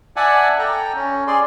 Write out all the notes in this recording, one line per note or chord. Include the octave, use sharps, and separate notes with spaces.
D5 E5 F#5 G#5 A5
A4 G5 A#5
C#4
G#4 D5 C6